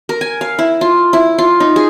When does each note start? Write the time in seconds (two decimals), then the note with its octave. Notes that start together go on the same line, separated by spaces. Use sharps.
0.09 A#4
0.21 G#5
0.41 F5
0.59 E4
0.81 F4
1.13 E4
1.38 F4
1.60 D#4
1.76 G#4